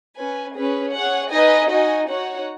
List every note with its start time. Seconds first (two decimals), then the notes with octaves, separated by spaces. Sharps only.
0.17 C#4 B4 G#5
0.55 C#4 G#4 B4
0.93 G#4 C#5 F#5
1.32 D#4 B4 D#5 G#5
1.71 D#4 F#4 D#5 G#5
2.09 D#4 F#4 C#5 F#5